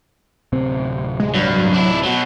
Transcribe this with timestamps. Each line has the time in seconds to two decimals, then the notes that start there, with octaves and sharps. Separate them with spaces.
0.53 D1 C3 C4
1.20 G#3
1.34 G2 F#3
1.74 D4 E4
2.03 B2 F#3